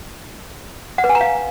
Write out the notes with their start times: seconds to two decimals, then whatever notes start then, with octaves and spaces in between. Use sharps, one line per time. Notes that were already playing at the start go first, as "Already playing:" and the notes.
0.98 F#5
1.04 B4
1.09 G#5
1.15 A#5
1.21 F5